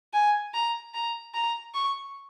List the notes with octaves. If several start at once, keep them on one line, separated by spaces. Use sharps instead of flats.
G#5
A#5
A#5
A#5
C#6